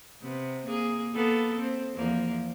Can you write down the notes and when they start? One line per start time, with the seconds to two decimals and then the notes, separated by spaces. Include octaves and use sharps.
0.22 C3 B3
0.65 A#3 G#4
1.14 A#3 B3 A4
1.60 C4
1.95 E2 F3 A#3